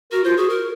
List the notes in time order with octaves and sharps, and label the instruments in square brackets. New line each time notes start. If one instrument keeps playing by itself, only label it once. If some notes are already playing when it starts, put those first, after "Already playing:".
[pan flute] F#4 [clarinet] A#4
[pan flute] F4 [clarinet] C5
[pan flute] F#4 [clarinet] G#4
[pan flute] A#4